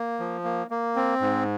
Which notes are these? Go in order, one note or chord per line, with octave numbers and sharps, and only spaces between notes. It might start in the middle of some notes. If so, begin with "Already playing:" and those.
Already playing: A#3
F3
A#3
A#3
C4
G#2